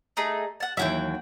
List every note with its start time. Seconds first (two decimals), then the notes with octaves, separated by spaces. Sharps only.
0.17 A3 D#4 G#4
0.60 F#5 A5
0.77 D#2 E3 F#3 E5 F#5 G5